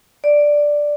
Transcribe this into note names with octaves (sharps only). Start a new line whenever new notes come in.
D5